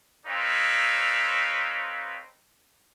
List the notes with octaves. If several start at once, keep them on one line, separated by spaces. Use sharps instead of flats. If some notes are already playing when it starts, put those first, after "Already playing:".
C4 D#4 A4 B4 C#5 F5